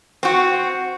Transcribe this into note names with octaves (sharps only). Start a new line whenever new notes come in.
C4 F#4